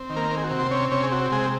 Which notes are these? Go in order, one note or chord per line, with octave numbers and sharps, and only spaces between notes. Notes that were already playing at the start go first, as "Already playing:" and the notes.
Already playing: C4
D#3
A#3 A#4
C4
G#4
F#4
C3
C5
C4 C#4 C#5
C3 C#4 C#5
G#4
C4 F#4
C3 G#3 G#4